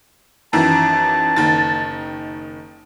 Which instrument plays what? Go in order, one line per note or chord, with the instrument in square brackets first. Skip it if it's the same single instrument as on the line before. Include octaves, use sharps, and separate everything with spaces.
[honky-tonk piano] F#2 D#3 E3 [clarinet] A5
[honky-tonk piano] F#1 D#3 A6